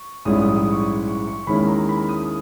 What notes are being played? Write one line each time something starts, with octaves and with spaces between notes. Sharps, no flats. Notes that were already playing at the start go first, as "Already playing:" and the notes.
Already playing: C#6
A#1 G#2 G3 C#4 E4 D#6
D#6
D#6
C#6
C#6
C#6
D#2 D#3 G#3 C#4 E4 B5
A#5
B5
D#6